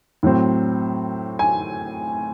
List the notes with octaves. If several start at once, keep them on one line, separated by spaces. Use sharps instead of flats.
A2 F#3 C4
G#5